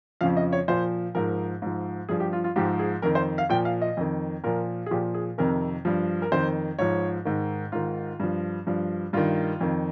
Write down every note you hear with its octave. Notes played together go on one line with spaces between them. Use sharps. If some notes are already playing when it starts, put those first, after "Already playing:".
F2 C#3 F3 F5
D#5
C#5
A#2 F3 C5
G#2 F3 A#4
G#2 F3
G2 F3 G#4
G4
F4
F4
G#2 F3 G4
G#4
F2 D#3 A#4
C5
F5
A#2 F3 G5
F5
D#5
F2 D#3
A#2 F3 A#4
G#4
A#2 F3 G4
G#4
F2 C3 D#3 A#4
G2 F3
A#4
F2 D#3 C5
G#2 F3 C#5
G#2 D#3
G#2 D#3 F4
G2 F3
G2 F3
G2 D#3 F4
F2 D#3